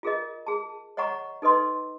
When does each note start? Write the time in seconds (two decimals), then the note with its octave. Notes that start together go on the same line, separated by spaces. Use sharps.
0.03 F4 G#4 A#4 D#5
0.47 G#4 A5
0.97 C#5 D#5 F#5 A#5 C#6
1.42 D#4 A4 B4 D#5 C6